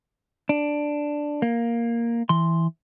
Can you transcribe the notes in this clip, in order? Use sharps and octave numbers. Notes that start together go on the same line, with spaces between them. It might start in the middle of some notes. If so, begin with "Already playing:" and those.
D4
A#3
E3 C6